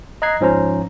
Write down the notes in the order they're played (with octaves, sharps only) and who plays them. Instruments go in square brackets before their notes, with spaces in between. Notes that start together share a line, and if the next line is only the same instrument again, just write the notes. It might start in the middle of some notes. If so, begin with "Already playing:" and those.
[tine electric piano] D#5 A#5 F#6 G#6 C7
G#2 F3 C#4 C5 A#5